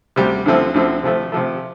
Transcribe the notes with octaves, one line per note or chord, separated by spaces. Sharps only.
D2 C3 G3
D2 D3 F3 C4 E4
D2 D3 F3 C4 E4
C3 F3 A3
C3 F3 A3